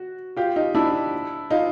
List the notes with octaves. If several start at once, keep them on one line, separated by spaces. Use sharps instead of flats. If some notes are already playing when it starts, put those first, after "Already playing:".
Already playing: F#4
F4 G4
D#4 F4
D4 E4
D#4 F4